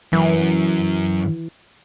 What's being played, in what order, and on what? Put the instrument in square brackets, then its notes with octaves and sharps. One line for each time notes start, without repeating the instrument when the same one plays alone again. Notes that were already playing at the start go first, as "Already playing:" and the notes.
[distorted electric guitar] F#2 [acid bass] E3